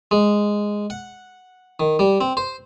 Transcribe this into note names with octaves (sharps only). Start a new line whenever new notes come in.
G#3
F#5
D#3
G3
C4
C5